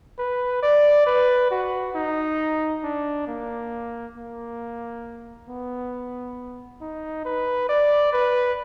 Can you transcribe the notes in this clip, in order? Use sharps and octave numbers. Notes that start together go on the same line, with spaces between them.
B4
D5
B4
F#4
D#4
D4
A#3
A#3
B3
D#4
B4
D5
B4